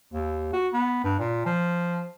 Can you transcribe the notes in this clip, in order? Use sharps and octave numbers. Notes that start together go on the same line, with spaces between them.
D#2
F#4
B3
G2
A#2
F3